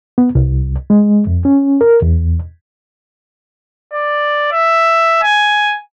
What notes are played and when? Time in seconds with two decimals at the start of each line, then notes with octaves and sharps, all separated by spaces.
0.18 B3
0.35 C2
0.90 G#3
1.27 F2
1.45 C#4
1.81 A#4
2.02 E2
3.93 D5
4.52 E5
5.23 G#5